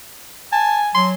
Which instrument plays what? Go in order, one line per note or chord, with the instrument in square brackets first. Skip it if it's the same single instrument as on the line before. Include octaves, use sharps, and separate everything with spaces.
[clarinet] G#5 [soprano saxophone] A5
[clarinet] F#3 [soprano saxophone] C6